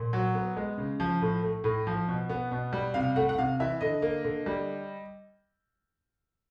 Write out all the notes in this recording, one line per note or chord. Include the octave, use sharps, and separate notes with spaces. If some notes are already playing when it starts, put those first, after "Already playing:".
Already playing: A#2
F#3
B3
G#3
C#3
F3
A2
A3
A2
F3
B2
B3
B2
G3
C3 F5
A3 F#5
F#5
C3 F5
E3 E5
D3 D#5
A#3
D3
G3